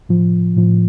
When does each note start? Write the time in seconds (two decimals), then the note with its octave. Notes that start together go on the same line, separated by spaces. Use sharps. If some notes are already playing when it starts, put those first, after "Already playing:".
0.09 A2 F3
0.57 A2 F3